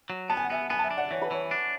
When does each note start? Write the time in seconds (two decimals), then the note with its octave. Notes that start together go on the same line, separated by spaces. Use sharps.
0.10 F#3
0.29 B3 A5
0.37 G#5
0.44 F#5
0.50 B3 E5 G#5
0.70 B3 G#5 B5
0.79 A5
0.83 E5 G#5
0.91 D4
0.97 D5 F#5
1.11 E3 C#5
1.22 B4
1.31 E3 C#5
1.51 D4